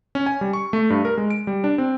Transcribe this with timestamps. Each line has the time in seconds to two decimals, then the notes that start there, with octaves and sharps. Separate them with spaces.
0.15 C#4
0.26 G#5
0.41 G3
0.53 C#6
0.73 A3
0.90 G2
1.05 A#4
1.17 G#3
1.30 D7
1.47 G3
1.64 D4
1.78 C4